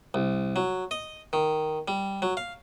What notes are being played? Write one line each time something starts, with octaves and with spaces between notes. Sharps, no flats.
C2
F#3
D#5
D#3
G3
F#3
F5